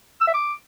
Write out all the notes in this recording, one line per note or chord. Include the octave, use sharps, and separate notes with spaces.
E6
E5
D6